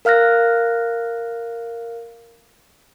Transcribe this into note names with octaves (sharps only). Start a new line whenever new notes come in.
A#4 F5 F6 F#6 A#6